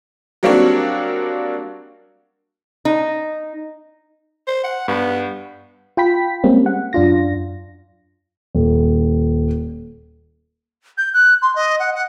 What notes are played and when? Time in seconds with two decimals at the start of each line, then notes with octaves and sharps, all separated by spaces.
0.43 F#3 G3 A#3 C4 D4 F#4
2.85 D#4
4.48 C5
4.64 F#5
4.88 G2 B3
5.97 F4 G5 B5 B6
6.44 G3 G#3 A#3 C4 C#4
6.66 F#5
6.93 F#2 D4 F4 A#6
8.55 D#1
10.98 G6
11.14 F#6
11.42 C6
11.56 D#5
11.79 F#5
11.95 F#5